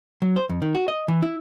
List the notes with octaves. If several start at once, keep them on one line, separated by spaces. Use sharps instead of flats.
F#3
C5
F2
D#3
F#4
D#5
E3
E4